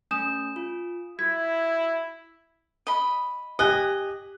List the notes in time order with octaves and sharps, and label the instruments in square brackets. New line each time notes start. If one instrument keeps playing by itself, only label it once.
[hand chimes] A3 C#4 G6 [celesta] G#5 D#6 E7
[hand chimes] F4
[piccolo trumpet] E4 [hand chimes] F#4 B6 [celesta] G#6
[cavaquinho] D#5 B5
[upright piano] G4 F#6 [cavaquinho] D#5 G#5